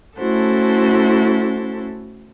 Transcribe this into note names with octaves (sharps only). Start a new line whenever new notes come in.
A3 C#4 E4 F#4 A4 C5